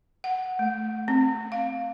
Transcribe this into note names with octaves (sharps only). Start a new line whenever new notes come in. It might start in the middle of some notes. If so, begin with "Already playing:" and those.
F#5
A3
C4
F5